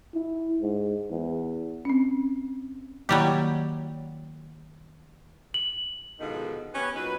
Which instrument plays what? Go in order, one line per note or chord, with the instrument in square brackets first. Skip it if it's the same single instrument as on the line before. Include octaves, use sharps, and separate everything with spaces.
[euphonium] E4
G#2
E2
[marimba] C4 C#4
[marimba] D#3 A#3 E4 [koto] F#3 G3 G4
[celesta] F#7
[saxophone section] B2 D3 D#3 F3 G#3 D#4
B3 C#4 G4 B4
A#2 F#3 D#4 B4